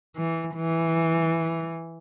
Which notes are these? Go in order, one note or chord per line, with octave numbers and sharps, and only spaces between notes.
E3
E3